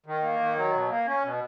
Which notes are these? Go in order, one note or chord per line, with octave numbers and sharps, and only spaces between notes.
D#3
A#3
D#3
F#3
B2
A#3
C#4
B2